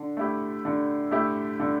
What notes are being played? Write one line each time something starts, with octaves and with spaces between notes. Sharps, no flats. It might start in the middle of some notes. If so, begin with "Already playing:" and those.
Already playing: D3
A3 E4 G4
D3
A3 E4 G4
D3